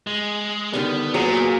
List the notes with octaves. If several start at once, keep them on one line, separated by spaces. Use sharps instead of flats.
G#3
D3 D#3 G3 B3
A#2 F#3 G#4